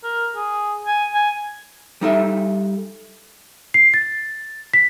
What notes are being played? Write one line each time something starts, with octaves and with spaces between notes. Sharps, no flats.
A#4
G#4
G#5
G#5
G3 D#4 A4 E5
C7
A6
B6